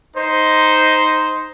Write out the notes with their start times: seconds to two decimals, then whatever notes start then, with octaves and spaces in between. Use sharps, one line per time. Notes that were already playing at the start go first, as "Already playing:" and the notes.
0.15 D#4 C5